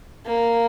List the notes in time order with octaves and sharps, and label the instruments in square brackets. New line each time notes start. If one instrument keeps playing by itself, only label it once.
[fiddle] A#3